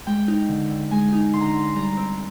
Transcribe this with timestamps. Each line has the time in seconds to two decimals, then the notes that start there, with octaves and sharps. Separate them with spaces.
0.07 G#3 G5
0.28 D#4
0.49 D3
0.70 D3
0.91 G#3 G#5
1.13 D#4
1.34 D3 C6
1.41 A#5
1.49 C6
1.55 D3
1.76 G3 A#5
1.97 C4